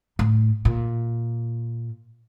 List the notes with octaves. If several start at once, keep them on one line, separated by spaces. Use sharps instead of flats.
A2
A#2